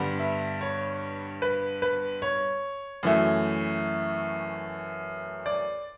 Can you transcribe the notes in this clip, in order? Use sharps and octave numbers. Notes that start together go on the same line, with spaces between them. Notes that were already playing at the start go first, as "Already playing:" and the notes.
Already playing: G2 D3 G3 B3
E5
C#5
B4
B4
C#5
F#2 E3 A3
D5